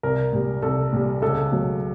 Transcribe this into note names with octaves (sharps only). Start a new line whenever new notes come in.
C2 A#4
A#2 G3
C2 A4
A#2 G3
C#2 A4
B2 F#3 A3